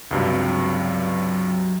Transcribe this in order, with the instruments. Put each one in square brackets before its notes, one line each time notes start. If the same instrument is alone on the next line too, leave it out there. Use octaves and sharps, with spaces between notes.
[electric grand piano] C#2 G2 C3 [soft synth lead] F#3